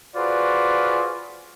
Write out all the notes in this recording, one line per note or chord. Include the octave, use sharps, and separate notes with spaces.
F4 F#4 G#4 B4 C5 D5